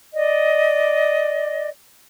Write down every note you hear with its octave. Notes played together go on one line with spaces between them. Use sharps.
D5 D#5